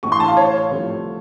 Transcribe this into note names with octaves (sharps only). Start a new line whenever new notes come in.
A1 A2 A3 C#6
C6
A5
F5
C#5
C2 C3 F3 A3